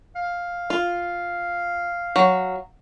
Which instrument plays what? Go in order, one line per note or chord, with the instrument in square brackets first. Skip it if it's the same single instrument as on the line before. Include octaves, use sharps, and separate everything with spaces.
[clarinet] F5
[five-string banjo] F4
F#3